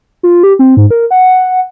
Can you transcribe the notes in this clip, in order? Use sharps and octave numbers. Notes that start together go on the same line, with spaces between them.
F4
G4
C4
G#2
A#4
F#5